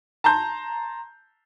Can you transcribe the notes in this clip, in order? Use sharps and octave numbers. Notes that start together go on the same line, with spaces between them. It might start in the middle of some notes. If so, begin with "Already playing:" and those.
A5 A#5 C6 G6